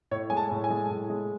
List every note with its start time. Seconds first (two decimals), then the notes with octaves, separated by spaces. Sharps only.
0.11 A2 C#5
0.30 G#3 G#5
0.37 A5
0.51 A2
0.64 G#5
0.70 G#3
0.91 A2
1.10 G#3